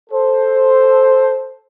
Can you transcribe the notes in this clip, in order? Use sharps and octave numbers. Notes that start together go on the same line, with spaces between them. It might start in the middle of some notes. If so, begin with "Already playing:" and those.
A4 C5